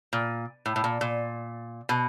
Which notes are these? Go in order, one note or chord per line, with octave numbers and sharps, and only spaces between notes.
A#2
A2
A2
A#2
A#2
B2